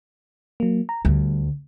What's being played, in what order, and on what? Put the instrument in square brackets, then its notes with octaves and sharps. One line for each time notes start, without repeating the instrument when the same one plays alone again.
[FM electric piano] F#3 A#3
A#5
[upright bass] D2 [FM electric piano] G3